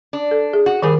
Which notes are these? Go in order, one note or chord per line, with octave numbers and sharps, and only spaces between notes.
D4
A4
G#4
F#4
D#3 G3 G#4 A#4